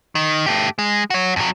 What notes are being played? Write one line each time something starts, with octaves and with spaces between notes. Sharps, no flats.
D#3
A3 G4
G#3
F#4 C#5
F2 F#3